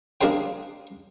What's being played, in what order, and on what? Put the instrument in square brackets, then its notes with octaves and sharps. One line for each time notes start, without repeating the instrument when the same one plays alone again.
[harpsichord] A#3 D4 G#4 A#4 C5 G5